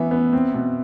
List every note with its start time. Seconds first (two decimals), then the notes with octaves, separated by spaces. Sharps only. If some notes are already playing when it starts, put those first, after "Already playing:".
Already playing: E3 B3 E5
0.11 B3
0.33 C4
0.54 B2